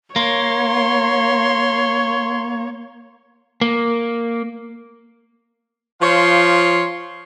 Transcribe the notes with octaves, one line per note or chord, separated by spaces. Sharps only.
A#3 C#5 C6
A#3
F3 C#5 F5 C6